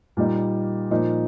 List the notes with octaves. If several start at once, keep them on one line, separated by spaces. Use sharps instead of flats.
A#2 G3 A#3 D#4
A#2 F3 D#4